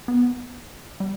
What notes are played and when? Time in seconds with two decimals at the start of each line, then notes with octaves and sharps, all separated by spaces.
0.08 B3
1.00 G3